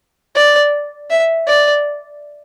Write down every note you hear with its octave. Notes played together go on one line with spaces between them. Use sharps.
D5
E5
D5